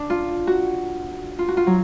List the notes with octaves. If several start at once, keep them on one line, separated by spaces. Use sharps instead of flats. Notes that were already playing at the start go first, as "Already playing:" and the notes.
Already playing: D4
F4
F#4
F4
F#4
F4
F#3